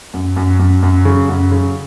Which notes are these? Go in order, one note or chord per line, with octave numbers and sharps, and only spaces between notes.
F#2
F#2
F#2
F#2
C#3
F#2
C#3